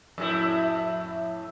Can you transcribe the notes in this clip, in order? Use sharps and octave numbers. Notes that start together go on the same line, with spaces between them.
F2 A2 E4